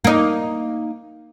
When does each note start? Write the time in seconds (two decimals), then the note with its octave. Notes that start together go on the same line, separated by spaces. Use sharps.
0.04 A#3 D#4